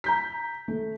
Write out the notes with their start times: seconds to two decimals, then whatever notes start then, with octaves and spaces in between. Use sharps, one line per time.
0.04 A#5 G6 B6
0.68 A3